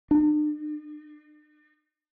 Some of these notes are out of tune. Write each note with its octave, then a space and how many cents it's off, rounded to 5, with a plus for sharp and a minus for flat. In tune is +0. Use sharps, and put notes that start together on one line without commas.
D4 +45